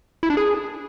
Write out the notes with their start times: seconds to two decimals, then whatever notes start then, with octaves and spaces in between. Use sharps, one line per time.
0.23 E4
0.30 D4
0.37 G#4